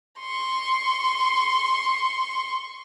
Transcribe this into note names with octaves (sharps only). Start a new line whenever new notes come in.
C6 C#6